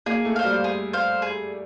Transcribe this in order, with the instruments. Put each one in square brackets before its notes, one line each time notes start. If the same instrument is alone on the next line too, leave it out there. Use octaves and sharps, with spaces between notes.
[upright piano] A#3 [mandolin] G#4
[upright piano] A3
[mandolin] C5 F5
[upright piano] G3
[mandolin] G#4
C5 F5
G#4